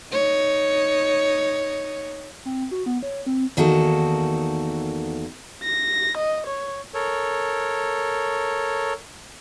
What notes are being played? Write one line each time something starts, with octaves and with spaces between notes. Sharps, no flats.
D#4 C#5
C4
F#4
B3
C#5
C4
E2 D#3 A#3 F#4 A4
A#6
D#5
C#5
A4 A#4 C#5